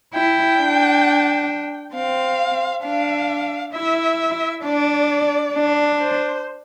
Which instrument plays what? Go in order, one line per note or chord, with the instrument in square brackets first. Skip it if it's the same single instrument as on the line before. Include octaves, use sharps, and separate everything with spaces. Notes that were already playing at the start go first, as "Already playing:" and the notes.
[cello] E4 [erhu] G5
[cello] D4
[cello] C4 [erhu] F5
[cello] D4 [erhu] F5
[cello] E4 [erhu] E5
[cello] D4 [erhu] D5
[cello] D4
[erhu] C5